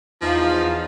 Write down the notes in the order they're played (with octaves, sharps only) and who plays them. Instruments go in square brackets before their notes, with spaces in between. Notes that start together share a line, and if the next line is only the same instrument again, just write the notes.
[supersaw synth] E2 D#4 F5 [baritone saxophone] F3